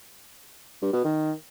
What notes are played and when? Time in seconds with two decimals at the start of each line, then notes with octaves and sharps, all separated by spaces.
0.82 G2
0.93 B2
1.04 D#3